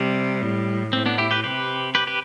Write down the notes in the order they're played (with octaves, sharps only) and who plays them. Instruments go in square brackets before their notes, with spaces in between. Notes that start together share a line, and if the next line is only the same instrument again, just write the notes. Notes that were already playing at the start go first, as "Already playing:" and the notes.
Already playing: [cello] C3 [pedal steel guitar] G3
[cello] A2
[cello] A2 [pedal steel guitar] C4
[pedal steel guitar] B3 D4
E4 G4
G4 B4
[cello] C3 [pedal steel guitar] G4 B4
[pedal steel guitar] G4 B4
G4 B4